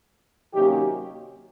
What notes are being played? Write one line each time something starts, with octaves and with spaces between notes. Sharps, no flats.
C3 D#3 F#3 A#3 C#4 G4